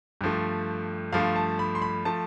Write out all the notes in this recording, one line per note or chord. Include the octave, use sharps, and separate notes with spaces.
G2 F3 A3
G2 F3 A3 F5
A5
B5
C6
B5
F3 A3 A5